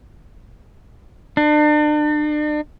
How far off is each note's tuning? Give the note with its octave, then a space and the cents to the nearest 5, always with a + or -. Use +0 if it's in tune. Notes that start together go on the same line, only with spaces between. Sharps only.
D4 +40